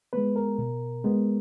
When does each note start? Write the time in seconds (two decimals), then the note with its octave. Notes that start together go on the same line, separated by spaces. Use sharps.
0.13 G#3 B3 B4
0.36 A#4
0.58 B2
1.04 G#3 B3